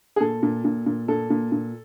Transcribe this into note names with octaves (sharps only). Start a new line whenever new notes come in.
G#4
A#2 A4
A#2
A#2
A#2
A#2 A4
A#2
A#2